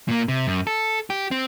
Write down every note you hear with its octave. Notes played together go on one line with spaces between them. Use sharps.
A#2 A#3
C3
F#2
A4
G4
C4